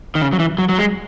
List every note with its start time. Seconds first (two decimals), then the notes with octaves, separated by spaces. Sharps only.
0.15 D#3
0.21 C#3
0.33 F#3
0.39 E3
0.58 F#3
0.69 F#3
0.78 G#3